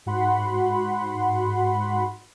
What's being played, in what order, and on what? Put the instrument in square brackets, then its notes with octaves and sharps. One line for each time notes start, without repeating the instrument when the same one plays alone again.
[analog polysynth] G#2 F#4 F#5 B5 C6